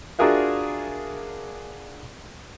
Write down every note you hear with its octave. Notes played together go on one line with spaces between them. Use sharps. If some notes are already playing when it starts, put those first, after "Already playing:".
D4 F4 F#4 G#4 A#4 E5